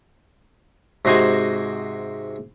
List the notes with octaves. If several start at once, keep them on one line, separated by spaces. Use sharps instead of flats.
G#2 C3 F#4 C5 D#5 G#5